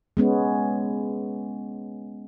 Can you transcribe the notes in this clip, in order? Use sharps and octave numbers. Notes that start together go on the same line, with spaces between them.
G#3 B3 C#4